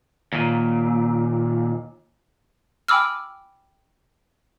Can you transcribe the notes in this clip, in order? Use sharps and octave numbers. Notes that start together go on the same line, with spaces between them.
D#2 A#2
G5 G#5 B5 D6 E6 F6